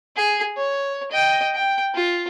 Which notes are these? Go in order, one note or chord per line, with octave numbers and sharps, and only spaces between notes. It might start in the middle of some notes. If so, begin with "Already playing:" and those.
G#4
C#5
D#5 G5
G5
F4